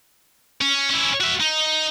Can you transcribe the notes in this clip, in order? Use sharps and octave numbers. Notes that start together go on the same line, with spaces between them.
C#4
C#4 E4
F#4 E5
D#4